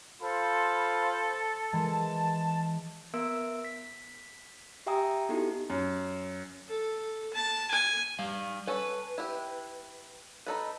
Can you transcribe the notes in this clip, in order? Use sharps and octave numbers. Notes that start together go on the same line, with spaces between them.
F4 A4 C5 B5
E3 G#3 A5
B3 A#4 E5 E6 D7
B6
G4 E5 G5 G#5 A#5 D#6
B3 D#4 E4 F#4 G4 A4
F#2
A4
A5
G#5
G3 F5
C#4 A4 B4
E4 G4
D#4 A4 B4